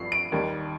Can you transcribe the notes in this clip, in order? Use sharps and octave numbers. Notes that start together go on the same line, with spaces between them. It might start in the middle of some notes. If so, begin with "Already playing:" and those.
Already playing: G2 F3 C7
D7
D#2 D#3 G3